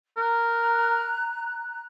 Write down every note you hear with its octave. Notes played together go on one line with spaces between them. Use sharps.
A#4 A#5 F#6